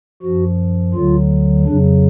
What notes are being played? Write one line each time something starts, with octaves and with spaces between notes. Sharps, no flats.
F#2 F3 F#4
D2 D3 F#3 F4
F2 C#3 F#3 D4